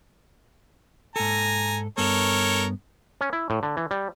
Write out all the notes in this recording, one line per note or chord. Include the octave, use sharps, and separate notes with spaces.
G#2 A4 G#5 A#5
G2 B3 A4 A#4 C#5
C#4
E4
A2
D3
E3
G3